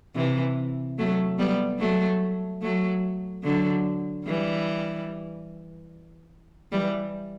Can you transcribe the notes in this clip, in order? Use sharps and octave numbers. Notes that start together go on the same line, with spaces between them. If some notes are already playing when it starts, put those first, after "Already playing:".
C3 E3
F#3 A3
G3 B3
F#3 A3
F#3 A3
D3 F#3
E3 G3
E3 G3